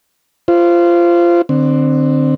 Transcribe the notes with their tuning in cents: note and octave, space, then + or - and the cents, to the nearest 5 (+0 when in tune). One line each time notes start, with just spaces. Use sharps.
F4 -20 C5 -5
D3 +30 C4 +0